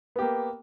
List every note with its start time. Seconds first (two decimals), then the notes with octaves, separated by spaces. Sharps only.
0.16 B3
0.19 G4
0.22 A#3